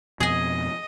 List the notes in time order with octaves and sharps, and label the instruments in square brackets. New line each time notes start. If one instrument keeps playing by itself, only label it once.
[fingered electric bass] F2 B2 [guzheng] G#4 G#5 [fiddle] D#5